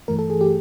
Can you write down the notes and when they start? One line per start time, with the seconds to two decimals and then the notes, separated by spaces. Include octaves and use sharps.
0.08 G2 E3 A3 A#4
0.19 A4
0.30 G#4
0.41 G4